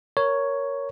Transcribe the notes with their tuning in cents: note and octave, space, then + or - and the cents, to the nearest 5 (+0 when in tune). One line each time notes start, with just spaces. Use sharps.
A#4 +0 C#5 +5